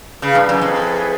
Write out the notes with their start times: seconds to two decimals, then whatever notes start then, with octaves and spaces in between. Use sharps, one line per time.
0.22 C#3 E4 G#4 B4
0.35 G2
0.49 F#2
0.61 F2